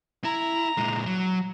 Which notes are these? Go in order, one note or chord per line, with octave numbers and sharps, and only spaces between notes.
E4 A#5
A#2 G#3
F#3